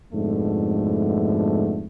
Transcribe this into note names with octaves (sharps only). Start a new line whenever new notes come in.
F2 G#2 B2 D3 A3